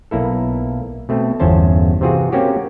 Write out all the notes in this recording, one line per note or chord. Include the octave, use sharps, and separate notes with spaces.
B1 A#3 E4 A4
B2 A3 C4
G1 E2 C#4 C5 A5
C3 E3 C4 F4 F#4 G#4
A#3 C4 C#4 F#4 G4